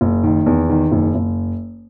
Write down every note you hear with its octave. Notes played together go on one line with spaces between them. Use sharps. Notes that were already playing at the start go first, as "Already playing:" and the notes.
F#1
D#3
E2
D#3
F#1
F#1